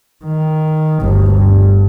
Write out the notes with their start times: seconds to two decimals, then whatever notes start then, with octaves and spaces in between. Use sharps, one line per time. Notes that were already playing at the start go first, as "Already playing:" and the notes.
0.25 D#3
1.02 G1 D2
1.32 G2